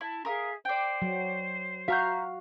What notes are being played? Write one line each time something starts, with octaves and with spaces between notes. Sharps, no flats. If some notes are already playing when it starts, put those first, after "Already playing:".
E4 A5
G#4 A#4 E5 F5 D#6
C5 D5 G5
F#3
F#4 E5 F5 A#5 G6